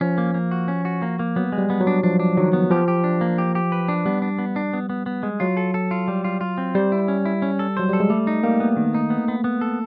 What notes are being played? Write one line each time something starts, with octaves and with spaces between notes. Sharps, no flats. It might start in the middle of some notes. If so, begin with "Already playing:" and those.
F3 C#4
A#3
A#3
F#4
C#4
F#4
A#3
A#3
F#3 B3
G#3
G3
B3
F#3
D4
F3 D4
D4
D#3 F#3
B3
F3 G4
G4
D4
A#3
G4
G4
B4
D4
G3 B3
D4
B3
D4
B3
B3
B3
G#3
F#3 F4
A4
A4
F4
G3
F4
F4
C4
G3 C5
E4
C#4
E4
C#4
A4
F#3 C5
G3 A4
G#3
G3 A3
D#4
G3 A#3
B3
D#3
D#4
B3
B3
B3
A4